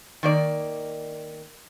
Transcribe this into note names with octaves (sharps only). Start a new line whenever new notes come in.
D#3 A#3 D5